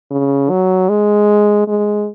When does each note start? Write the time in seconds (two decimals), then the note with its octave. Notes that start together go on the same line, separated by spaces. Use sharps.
0.11 C#3
0.50 F#3
0.89 G#3
1.68 G#3